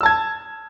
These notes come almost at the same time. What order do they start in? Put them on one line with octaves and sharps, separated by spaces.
E6 A5 G#6